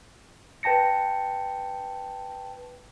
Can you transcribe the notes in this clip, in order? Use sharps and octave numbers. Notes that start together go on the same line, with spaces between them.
B4 G5 A5 A#6 C#7